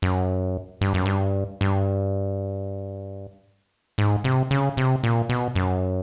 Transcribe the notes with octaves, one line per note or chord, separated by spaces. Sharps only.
F#2
G2
F#2
G2
G2
G#2
C3
C#3
C3
A#2
B2
F#2